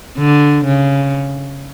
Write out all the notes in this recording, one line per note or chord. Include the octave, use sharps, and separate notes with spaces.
D3
C#3